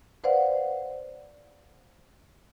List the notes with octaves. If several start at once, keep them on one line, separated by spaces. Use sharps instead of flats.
B4 C5 D5 F5 F#5